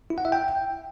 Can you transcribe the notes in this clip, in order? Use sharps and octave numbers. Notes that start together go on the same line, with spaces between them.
E4
F#5
E5
G5